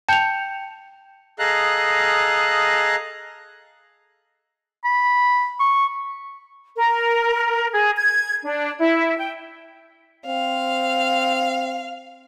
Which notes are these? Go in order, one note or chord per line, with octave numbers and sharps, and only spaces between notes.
G5 A5 G6 C#7 F7
G#4 A4 D#5 F5 A#5 F#6
B5
C#6
A#4
G#4
G#6
D4
E4
G5
C4 F5